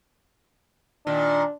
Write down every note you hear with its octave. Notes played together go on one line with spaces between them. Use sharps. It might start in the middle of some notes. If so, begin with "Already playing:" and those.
A#2 D#3 D4